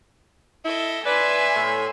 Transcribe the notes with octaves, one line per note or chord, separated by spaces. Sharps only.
E4 A4 D#5
B4 D5 E5 G#5 B5 C6
A2